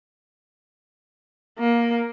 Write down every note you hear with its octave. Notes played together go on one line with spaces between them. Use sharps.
A#3